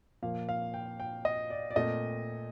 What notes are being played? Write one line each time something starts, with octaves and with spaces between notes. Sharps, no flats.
A#2 F3 A#3 F5
F5
G5
G5
D#5
D5
D5
A#2 A3 C4 D#5